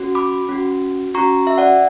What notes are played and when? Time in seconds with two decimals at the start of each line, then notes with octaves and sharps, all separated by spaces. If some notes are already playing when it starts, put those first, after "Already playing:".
Already playing: C#4 F#4
0.15 B5 D6
0.49 C#4 F#4
1.14 C#4 F#4 A#5 C#6
1.47 E5
1.58 D5 F#5